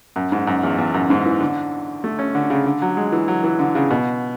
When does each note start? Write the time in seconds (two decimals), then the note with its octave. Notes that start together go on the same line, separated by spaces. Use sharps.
0.16 F#2
0.32 G#2
0.47 F#2
0.63 E2
0.78 E2
0.94 F#2
1.10 G#2
1.26 E3
1.41 D3
2.04 A3
2.19 C#4
2.35 D3
2.50 C#3
2.66 D3
2.82 F#3
2.97 G#3
3.12 E3
3.28 F#3
3.44 E3
3.59 D3
3.75 C#3
3.91 B2